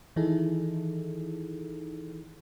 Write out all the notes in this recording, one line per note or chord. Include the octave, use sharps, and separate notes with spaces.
D#3 E3 D#4 E4 G#4 A4